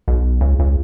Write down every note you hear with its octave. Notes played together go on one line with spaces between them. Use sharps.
B1
C#2
C#2